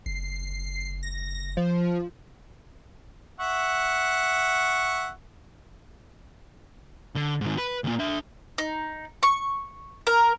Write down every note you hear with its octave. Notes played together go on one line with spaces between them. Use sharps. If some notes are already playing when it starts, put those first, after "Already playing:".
F#1 C7
A#6
F3
E5 F#5 C#6
D3
G#2 D#3
B4
D2 A#2
D4 E5
D#4
C#6
A#4